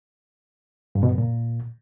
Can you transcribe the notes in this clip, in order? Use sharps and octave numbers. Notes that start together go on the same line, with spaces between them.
G2
B2
F#2
A#2